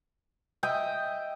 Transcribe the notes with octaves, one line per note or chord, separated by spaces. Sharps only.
D#5 E5 G5